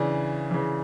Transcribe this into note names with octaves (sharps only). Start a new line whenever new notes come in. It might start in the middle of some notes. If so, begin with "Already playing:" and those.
Already playing: C#3 E3 D4
C#3 E3